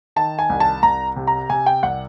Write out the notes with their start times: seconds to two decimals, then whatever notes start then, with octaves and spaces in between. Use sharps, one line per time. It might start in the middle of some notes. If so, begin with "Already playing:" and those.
0.16 D#3 A5
0.39 G#5
0.50 C2
0.60 A5
0.83 C2 A#5
1.16 C3
1.27 A#5
1.50 C3 G#5
1.66 G5
1.83 C2 F#5